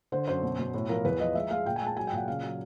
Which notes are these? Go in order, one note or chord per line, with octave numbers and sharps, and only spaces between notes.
D3 C5
F#2 C5
B2
B2
A2
F3 A#4
E2 B4
F3 D#5
G#3 E5
G#3 F5
A#2 G5
G#5
G#3
A5
F#3 G#5
G5
A#2 F#5
C#3 F5
F#3